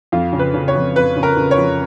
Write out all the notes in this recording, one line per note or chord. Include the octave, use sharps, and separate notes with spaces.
F2 F4
C#3
B4
C#3
C#5
F2
F2 B4
C#3
A#4
C#3
C#5
F2